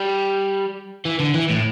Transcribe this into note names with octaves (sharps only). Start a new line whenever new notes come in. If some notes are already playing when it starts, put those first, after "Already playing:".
Already playing: G3
E3
D3
E3
A2